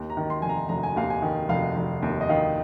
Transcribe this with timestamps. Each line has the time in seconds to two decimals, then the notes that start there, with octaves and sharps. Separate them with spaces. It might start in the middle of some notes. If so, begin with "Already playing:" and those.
Already playing: D#2
0.10 A#5
0.17 D#3
0.30 C6
0.42 F1 G#5
0.49 A#5
0.69 F1 A#5
0.83 G#5
0.96 D#2 F5
1.10 G#5
1.22 D#3
1.49 F1 F5
1.76 F1
2.02 D#2
2.21 D#5
2.29 D#3 F5